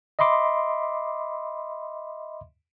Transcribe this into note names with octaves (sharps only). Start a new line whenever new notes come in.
D#5 E5 B5 C6 D6